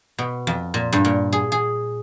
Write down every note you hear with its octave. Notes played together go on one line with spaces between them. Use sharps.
B2
F2
A#2
G2
A#2
G#4
G#4